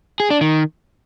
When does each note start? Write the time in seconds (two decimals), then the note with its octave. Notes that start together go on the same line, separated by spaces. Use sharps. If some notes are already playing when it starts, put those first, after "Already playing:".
0.20 G#4
0.30 D4
0.41 D#3